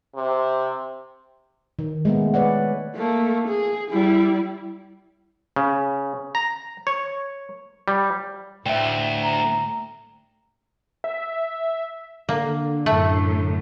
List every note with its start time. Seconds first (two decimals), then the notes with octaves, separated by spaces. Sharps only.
0.15 C3
1.79 D#3
2.05 G#3 A3 B3
2.34 B4 C#5 D5 F#5
2.95 A3 A#3
3.48 G#4
3.91 G3 E4
5.56 C#3
6.35 A#5
6.87 C#5
7.88 G3
8.66 D2 A2 E5 G5
9.23 A#5
11.04 E5
12.29 D3 A#3
12.86 F#2 A2 A3